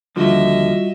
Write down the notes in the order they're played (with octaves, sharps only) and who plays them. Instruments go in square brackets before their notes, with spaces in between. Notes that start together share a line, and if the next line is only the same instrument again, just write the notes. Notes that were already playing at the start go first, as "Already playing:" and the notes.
[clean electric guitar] D#2 D3 F3 [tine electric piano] G3 F4 F#4 [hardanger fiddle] D#5 E5